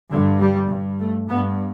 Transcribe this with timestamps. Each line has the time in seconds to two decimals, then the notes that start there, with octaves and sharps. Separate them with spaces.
0.11 G2 D3
0.40 G3
0.69 G2
0.99 A3
1.28 G2 B3